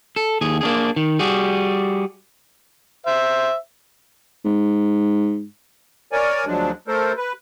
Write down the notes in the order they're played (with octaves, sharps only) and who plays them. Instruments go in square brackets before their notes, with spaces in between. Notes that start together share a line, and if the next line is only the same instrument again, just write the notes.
[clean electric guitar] A4
D#2 G#4
A#3 D4 G#4
D#3
G3 F#4 G#4
[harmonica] C5 E5
[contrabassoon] G#2
[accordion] A#4 C#5 D5 G#5
D2 F3 F#3 G#3 D4
A3 A4 A#4 C5
B4